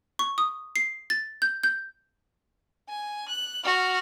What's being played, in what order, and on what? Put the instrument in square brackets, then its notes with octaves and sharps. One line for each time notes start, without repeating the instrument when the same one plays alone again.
[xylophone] C#6
D#6
C7
A6
G6
G6
[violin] G#5
F#6
F#4 F6